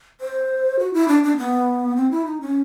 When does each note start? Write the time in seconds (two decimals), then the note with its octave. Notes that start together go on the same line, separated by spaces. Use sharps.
0.21 C5
0.79 F#4
0.94 E4
1.08 D4
1.23 D4
1.38 B3
1.97 C4
2.11 E4
2.26 D#4
2.41 C#4